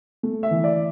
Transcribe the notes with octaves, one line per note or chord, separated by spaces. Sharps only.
A3
E5
E3
D5